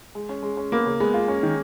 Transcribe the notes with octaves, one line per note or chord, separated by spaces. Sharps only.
G#3
C#4
G#3
C#4
A#3 B3
C#3
G#3 B3
F4
C#4
D#3